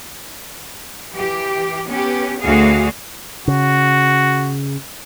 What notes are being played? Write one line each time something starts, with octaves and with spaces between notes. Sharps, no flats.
E3 G4
B3 C#4 G4
D2 F#4 G#4 F5
C#3 F#4